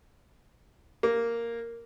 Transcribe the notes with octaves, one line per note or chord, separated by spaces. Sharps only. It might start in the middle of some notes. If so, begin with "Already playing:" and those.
A#3